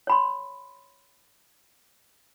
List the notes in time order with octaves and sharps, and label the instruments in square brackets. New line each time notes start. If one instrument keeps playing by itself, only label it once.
[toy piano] C#5 B5 C6